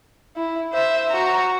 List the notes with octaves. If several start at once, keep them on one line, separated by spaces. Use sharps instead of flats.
E4
C5 E5
F#4 A#5